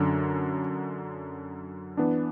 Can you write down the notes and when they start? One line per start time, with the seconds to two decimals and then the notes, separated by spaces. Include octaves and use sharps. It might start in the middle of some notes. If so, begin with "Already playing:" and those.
Already playing: F#2 D3 F#3
1.97 E3 B3 D4